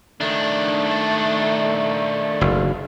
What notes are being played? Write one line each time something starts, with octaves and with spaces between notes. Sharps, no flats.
D#3 A3 D4
F#1